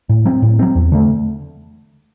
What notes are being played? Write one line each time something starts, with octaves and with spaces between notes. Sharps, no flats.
A2
F#3 C4
A2
F#3 C4
E2
D3 A3